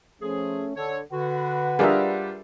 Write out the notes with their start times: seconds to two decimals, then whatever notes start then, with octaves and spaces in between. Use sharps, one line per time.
0.22 F3 A3 C#4 G#4
0.77 D3 A4 C#5
1.12 D3 F#4 B4 F#5
1.79 G3 D4 F4 G#4 A#4 E5